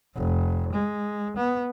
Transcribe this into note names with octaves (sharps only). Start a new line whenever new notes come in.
F1
G#3
B3